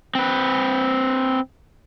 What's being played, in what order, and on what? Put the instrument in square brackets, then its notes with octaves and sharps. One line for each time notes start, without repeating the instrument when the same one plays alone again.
[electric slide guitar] C4 B4